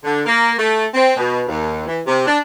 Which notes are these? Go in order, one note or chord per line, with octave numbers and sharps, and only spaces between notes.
D3
A#3
A3
C4
B2
D#2
E3
C3
D4